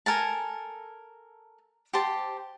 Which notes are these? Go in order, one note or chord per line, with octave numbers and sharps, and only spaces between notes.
A4 A#4 G#5 A5
G4 C5 A5